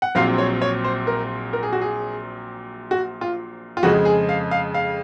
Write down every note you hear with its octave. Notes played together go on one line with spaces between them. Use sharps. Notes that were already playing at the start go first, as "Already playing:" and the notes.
F#5
A#1 A#2 F#3 C4 F5
C#5
C#5
C5
A#4
A#4
G#4
F#4
G#4
F#4
F4
F4
F2 C#3 G#3 F#4
G#4
F5
F5
F5